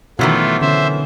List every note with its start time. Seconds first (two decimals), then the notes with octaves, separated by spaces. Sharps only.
0.19 B2 D#3 E3 F#3 A3 F4
0.61 D3 C#4 C5 E5